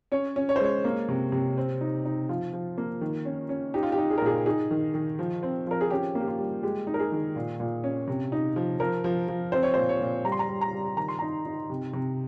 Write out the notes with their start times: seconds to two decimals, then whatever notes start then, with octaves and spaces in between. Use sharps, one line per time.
0.12 C#4 C#5
0.36 C#4
0.49 C#5
0.56 C5
0.60 G#3 C#5
0.84 A#3
1.09 C3
1.32 C3
1.57 C4
1.81 D#4
2.05 D#4
2.29 F3 F4
2.53 F3
2.78 A#3
3.01 D#3
3.25 C#4
3.49 C#4
3.74 D#4 G4
3.83 F4
3.92 G4
3.98 D#4
4.10 G#4
4.18 A#4
4.22 A#2 G#4
4.46 D#4 G#4
4.71 D#3
4.94 D#3
5.19 F3
5.43 C4
5.67 F3 A#4
5.81 G#4
5.90 C#4 G4
6.15 A#3
6.20 G4
6.28 F4
6.39 G3
6.63 G#3 G4
6.87 D#4
6.94 A#4
6.99 G#4
7.12 D#3
7.36 A#2
7.60 A#2
7.84 C#4
8.08 C3
8.32 D#4
8.56 F3
8.80 F3 A#4
9.04 F3
9.28 F3
9.52 C4 C5
9.63 C#5
9.74 C5
9.77 A#2
9.89 C#5
10.01 A#2
10.25 G3 A#5
10.32 C6
10.39 A#5
10.49 G3
10.61 A#5
10.73 G3
10.97 D#3 A#5
11.08 C6
11.19 D#4 A#5
11.45 D#4
11.70 C3
11.93 C3